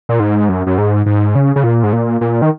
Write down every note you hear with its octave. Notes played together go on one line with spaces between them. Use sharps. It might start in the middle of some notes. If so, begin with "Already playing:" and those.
A#2
G#2
F#2
F#2
G#2
G#2
C#3
C#3
A#2
G#2
A#2
A#2
D#3